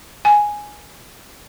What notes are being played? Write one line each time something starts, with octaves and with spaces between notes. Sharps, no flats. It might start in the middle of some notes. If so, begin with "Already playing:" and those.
G#5